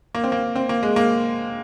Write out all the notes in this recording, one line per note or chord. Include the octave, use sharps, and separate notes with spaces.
A#3
C4
A#3
C4
A#3
G#3
A#3